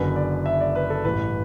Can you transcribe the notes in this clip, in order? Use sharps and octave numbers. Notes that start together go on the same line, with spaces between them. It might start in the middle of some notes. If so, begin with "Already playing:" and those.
Already playing: F#1 F#2 D3 B4
D5
E5
D5
B4
A4
A1 G2 E3 B4